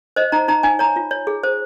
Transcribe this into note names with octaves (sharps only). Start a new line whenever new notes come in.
C5 D#5
D#4 A#5
D#4 A#5
D#4 G#5
C#5 A#5
F4
C#5
G#4
C5